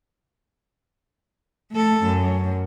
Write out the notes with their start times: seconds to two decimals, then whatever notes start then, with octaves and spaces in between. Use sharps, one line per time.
1.72 A3 A4
2.04 F#2